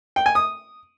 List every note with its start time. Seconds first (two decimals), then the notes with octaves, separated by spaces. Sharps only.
0.16 G5
0.26 G#5
0.35 D#6